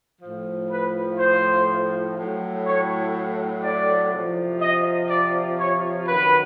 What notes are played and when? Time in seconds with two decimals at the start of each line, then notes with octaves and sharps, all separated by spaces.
0.22 A2 F3
0.71 B4
1.19 C5
2.17 A2 F#3
2.65 C#5
3.63 D5
4.12 C3 F3
4.61 D#5
5.10 D5
5.58 C#5
6.08 F#2 D#3 F#3 B4